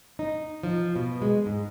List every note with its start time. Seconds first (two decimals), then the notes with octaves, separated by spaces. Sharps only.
0.19 D#4
0.63 F3
0.96 B2
1.22 G#3
1.46 G#2